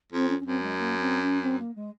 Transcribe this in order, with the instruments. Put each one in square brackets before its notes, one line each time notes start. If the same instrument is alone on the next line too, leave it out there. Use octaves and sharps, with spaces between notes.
[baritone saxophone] F2 [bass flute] C4
[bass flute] C#4
C#4
[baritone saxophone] F#2 [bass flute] C4
[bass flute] G#3
A#3
C4
C#4
C4
A#3
G#3